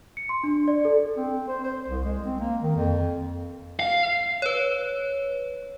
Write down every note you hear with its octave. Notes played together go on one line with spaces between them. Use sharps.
C#7
C6
D4
D5
A4
C4
C5
C5
C2
G#3
C4
A#3
D#3
F2
F5
B4 C#5